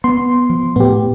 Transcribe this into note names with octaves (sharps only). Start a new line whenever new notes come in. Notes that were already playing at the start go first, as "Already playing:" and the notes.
B3 C6
F3
A2 B3 G4